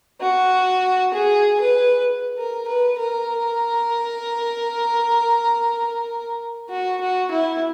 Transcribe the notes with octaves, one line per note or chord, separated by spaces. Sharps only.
F#4
G#4
B4
A#4
B4
A#4
F#4
F#4
E4